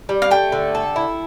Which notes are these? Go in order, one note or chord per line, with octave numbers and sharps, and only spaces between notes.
G3
F5
A3 G5
D3
A4
E4